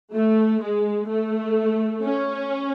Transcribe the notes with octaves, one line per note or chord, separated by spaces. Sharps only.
A3
G#3
A3
C#4